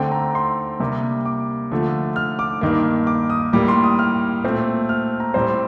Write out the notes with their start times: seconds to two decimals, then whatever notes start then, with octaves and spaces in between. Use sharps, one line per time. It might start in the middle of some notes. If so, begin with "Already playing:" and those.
Already playing: D3 A3 C4 G5
0.12 A#5
0.35 C6
0.80 C3 G3 A#3
1.25 D6
1.71 D3 F3 A3
2.16 F6
2.39 D6
2.61 G2 D#3 A#3
3.07 D6
3.30 D#6
3.53 A2 G3 A#3 D6
3.68 C6
3.84 D#6
3.99 F6
4.43 A#2 A3 C4
4.89 F6
5.20 A#5
5.34 A2 G3 C4 C5